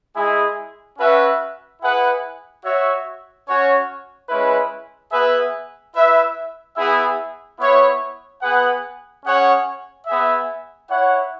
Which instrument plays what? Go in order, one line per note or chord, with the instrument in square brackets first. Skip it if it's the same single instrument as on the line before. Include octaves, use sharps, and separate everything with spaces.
[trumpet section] G#3 E4 G#4
C#4 F#4 B4 E5
E4 G#4 B4 F#5
F#4 C#5 E5
C#4 F#4 C#5
G#3 C#4 E4 B4
B3 G#4 B4 E5
E4 B4 E5
B3 E4 G#4 E5
B3 E4 C#5 E5
B3 G#4 B4 F#5
C#4 G#4 C#5 F#5
B3 G#4 E5
E4 C#5 F#5